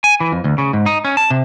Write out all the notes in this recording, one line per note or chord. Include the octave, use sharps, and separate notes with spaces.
G#5
E3
F2
D2
C#3
G#2
D#4
C#4
A5
C3